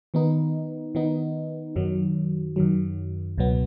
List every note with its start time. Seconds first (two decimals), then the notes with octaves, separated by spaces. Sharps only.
0.14 D#3 B3 D#4
0.95 D#3 B3 D#4
1.76 F#2 D#3 F#3
2.56 F#2 D#3 F#3
3.38 C#2 B2 F#3 B3